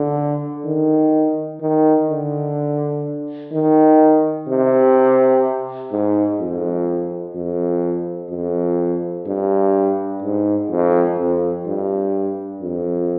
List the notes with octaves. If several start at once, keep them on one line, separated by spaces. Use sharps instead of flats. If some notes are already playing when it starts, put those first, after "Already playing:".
Already playing: D3
D#3
D#3
D3
D#3
C3
G#2
F2
F2
F2
G2
G#2
F2
F2
G2
F2